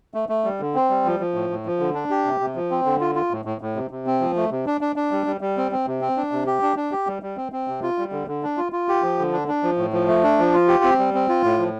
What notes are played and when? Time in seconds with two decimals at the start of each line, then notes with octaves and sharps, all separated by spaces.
0.14 A3
0.29 A3
0.44 G3
0.60 D3
0.75 C4
0.90 G3
1.05 F3
1.20 F3
1.35 A2
1.50 A2
1.66 F3
1.80 D3
1.95 D4
2.10 G4
2.25 C3
2.40 C3
2.55 F3
2.71 C4
2.86 D3
3.01 F4
3.15 F4
3.31 A2
3.45 A2
3.61 A2
3.76 C3
3.91 C3
4.07 C4
4.20 F3
4.36 A3
4.51 C3
4.66 D4
4.81 D4
4.96 D4
5.11 G3
5.26 G3
5.41 G3
5.57 C4
5.72 C4
5.87 C3
6.01 C4
6.17 D4
6.32 C3
6.46 G4
6.62 D4
6.77 D4
6.91 G4
7.07 G3
7.22 G3
7.37 C4
7.52 C4
7.68 C3
7.83 F4
7.98 G3
8.12 D3
8.28 D3
8.43 D4
8.57 F4
8.72 F4
8.88 G4
9.02 F3
9.19 D3
9.32 D4
9.48 D4
9.63 F3
9.78 A2
9.93 F3
10.08 A3
10.23 D4
10.38 F3
10.53 F4
10.68 G4
10.84 C4
10.99 G3
11.14 C4
11.29 F4
11.43 A2
11.59 F3